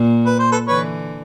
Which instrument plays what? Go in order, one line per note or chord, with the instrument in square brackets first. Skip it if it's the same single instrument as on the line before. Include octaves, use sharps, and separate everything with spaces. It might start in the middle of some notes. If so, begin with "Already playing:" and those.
Already playing: [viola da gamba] A#2
[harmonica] B4
C5
A4 B4
[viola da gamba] D3 E3 [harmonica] B4 C#5